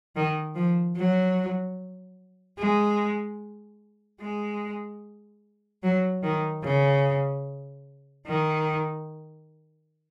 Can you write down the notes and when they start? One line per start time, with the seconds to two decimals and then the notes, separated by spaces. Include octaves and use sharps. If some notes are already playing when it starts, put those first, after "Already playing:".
0.16 D#3
0.55 F3
0.97 F#3
2.58 G#3
4.21 G#3
5.83 F#3
6.23 D#3
6.64 C#3
8.26 D#3